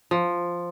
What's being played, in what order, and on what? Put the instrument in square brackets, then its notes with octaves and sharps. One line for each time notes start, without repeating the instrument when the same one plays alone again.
[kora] F3